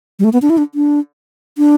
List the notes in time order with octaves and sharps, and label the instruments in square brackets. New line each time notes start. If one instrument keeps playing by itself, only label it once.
[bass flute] G3
A3
B3
D4
E4
D4
D4
D4